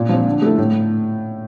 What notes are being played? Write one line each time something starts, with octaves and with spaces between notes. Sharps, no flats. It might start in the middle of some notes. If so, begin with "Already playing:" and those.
Already playing: A#2
F3 C4
D3
A3 E4 A4
A2